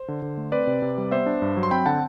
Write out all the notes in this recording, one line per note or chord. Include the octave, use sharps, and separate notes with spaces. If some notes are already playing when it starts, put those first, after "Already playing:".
Already playing: C5
D3
D3
A3
C4 B4 D5
C3
C3
G3
B3 C5 E5
D4
G2
F#3
C6
C4 G5 B5
D3 F#5 A5